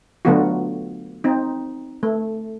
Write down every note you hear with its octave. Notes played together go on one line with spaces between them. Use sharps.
D3 F#3 A3 B3 F4 F#4
C4 D#4
A3